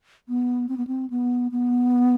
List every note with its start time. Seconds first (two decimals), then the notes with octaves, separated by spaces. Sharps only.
0.29 B3
0.69 C4
0.77 B3
0.87 C4
1.10 B3
1.52 B3